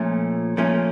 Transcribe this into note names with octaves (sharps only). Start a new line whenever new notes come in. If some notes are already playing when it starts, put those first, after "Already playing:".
Already playing: A#2 F3 A3 C#4
A#2 F3 A3 C#4